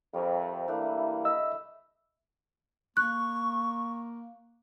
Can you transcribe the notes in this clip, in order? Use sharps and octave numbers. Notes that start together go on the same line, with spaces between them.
F2 G3 A#4 E5
E3 G3 A3 A#3 D4 E4
D#5 E5 B5 E6
A#3 C#6 F#6